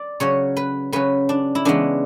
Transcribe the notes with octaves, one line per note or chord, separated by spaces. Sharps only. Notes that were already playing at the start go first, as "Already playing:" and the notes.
Already playing: D5
C#3 F#3 C#4 C#5
B4
C#3 F#3 C#4 B4
D4
E4
C#3 E3 G#3 B3 D4